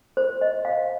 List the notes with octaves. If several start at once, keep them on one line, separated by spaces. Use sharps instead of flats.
C5
D#5
F5